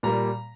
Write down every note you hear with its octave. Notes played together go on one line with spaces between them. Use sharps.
A#2 G3 A#3 A#5